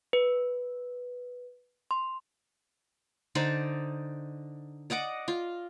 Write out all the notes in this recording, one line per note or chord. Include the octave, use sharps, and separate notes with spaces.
B4
C6
D3 D#4 C5 D5
D5 D#5 F#5 D6
F4